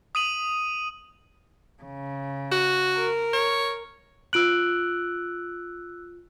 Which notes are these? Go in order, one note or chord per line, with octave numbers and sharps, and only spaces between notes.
D#6 D#7 F#7
C#3
F#4
A#4
C#5
F4 E6 F#6 D7 F#7